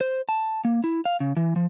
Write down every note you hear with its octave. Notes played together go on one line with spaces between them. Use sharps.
C5
A5
A#3
E4
F5
C#3
E3
F3